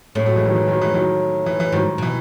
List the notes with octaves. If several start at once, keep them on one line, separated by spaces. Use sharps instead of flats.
A2 A3 C#4
F#3 A3
E3 G#3
D#3 F#3
E3
D#3 F#3
E3 G#3
D#3 F#3
E3
E3
G#2 D#3 F#3
B2 E3